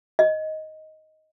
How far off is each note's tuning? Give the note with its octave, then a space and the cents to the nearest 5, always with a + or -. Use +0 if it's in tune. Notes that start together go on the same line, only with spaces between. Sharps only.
D#5 +10